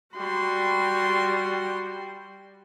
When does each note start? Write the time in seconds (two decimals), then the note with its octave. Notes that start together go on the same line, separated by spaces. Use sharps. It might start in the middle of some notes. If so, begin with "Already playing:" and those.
0.16 G3 F#4 C6